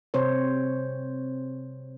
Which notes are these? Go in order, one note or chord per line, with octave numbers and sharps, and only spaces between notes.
C3 C4 C5 C#5